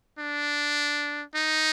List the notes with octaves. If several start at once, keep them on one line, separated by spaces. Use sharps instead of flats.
D4
D#4